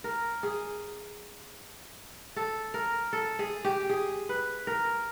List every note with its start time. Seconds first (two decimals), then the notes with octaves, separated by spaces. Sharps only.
0.04 A#4
0.43 G#4
2.36 A4
2.74 A#4
3.13 A4
3.39 G#4
3.64 G4
3.90 G#4
4.29 B4
4.67 A#4